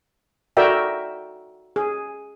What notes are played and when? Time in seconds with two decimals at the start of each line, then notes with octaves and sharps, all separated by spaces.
0.57 F#4 A4 A#4 D5 E5 G5
1.76 G#4